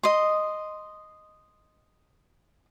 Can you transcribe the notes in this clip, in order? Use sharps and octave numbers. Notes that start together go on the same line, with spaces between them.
D#5 C6